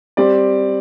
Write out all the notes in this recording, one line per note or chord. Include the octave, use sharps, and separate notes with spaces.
G3 C4 G4 D5